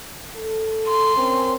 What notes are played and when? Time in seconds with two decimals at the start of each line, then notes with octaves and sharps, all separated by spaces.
0.36 A4
0.88 C6
1.17 C4 C#4 A#4